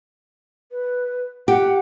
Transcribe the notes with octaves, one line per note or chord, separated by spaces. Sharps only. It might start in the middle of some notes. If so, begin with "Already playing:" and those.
B4
G4 F#5